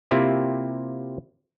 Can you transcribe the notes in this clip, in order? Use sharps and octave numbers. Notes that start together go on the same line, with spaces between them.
C3 A#3 C4 E4 F4 G4